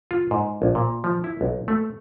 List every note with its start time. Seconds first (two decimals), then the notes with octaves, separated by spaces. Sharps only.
0.11 F4
0.31 G#2
0.62 A#1
0.75 A#2
1.04 F3
1.24 E4
1.41 B1
1.68 A3